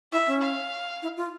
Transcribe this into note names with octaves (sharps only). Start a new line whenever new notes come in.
E4 E5
C#4
F5
E4
F4